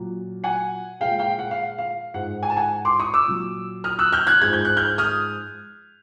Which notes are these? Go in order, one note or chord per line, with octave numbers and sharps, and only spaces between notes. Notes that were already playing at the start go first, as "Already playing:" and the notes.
Already playing: A#2 F#3
F#5 G#5
A#2 F3 G#3 F5 G5
F5 G5
F#5
F5
F5
G#2 F3 G#3 F#5
G#5
A5
F#5 G#5
C6 D6
C#6 D#6
D6 E6
A#2 F#3
D#6 F6
E6 F#6
F6 G6
F#6 G#6
G#2 F3 G#3 G#6
G6
F#6
F6 G6
D#6 F6